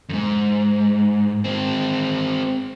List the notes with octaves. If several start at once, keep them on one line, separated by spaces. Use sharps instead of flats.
F2 G#2
G#3 C4